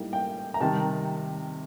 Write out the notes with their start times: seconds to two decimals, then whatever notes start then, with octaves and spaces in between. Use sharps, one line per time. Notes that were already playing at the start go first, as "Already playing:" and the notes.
Already playing: A2 G3 A#3 D#4
0.13 G5
0.54 A#5
0.61 C3 D#3 G3 A5